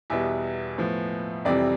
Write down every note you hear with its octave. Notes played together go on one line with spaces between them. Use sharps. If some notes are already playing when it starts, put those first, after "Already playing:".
E2 B2 G3 B3 E5
A2 F3 B3
F2 C3 E3 G3 C4 D5